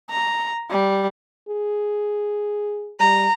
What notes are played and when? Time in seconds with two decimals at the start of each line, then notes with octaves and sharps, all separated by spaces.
0.10 A#5
0.70 G3
1.48 G#4
3.00 G3 A#5